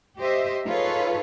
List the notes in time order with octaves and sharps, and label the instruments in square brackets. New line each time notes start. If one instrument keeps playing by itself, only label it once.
[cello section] G4 C5 D#5 E5
D#4 F4 G#4 A4 B4 C#5